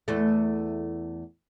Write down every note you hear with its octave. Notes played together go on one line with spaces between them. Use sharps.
E2 A3